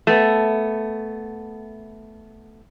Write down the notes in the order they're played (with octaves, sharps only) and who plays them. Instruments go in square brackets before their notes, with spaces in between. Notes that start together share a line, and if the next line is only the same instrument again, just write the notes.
[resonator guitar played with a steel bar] A3 B3